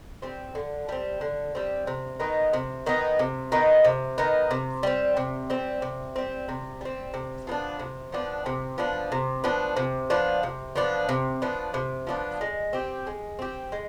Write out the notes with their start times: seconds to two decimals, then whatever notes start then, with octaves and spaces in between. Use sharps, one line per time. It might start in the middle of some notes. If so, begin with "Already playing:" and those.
0.22 G3 C4
0.55 D3
0.89 G3 C4
1.21 D3
1.55 G3 C4
1.87 C3
2.20 D#3 B3 D#4
2.53 C3
2.86 D#3 B3 D#4
3.19 C3
3.52 D#3 B3 D#4
3.84 C3
4.18 D#3 B3 D#4
4.51 C3
4.83 G3 C4
5.17 C3
5.50 G3 C4
5.82 C3
6.16 G3 C4
6.49 C3
6.81 G3 C4
7.14 C3
7.47 F3 B3 D4
7.79 C3
8.12 F3 B3 D4
8.46 C3
8.78 F3 B3 D4
9.12 C3
9.44 F3 B3 D4
9.76 C3
10.10 F3 B3 D4
10.43 C3
10.76 F3 B3 D4
11.09 C3
11.42 F3 B3 D4
11.74 C3
12.07 F3 B3 D4
12.41 G#3
12.73 C4 G4
13.07 G#3
13.39 C4 G4
13.72 G#3